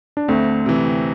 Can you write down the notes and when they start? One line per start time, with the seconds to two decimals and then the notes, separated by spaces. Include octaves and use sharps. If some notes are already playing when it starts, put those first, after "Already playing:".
0.17 D4
0.28 D2 A3 C4
0.66 C3 E3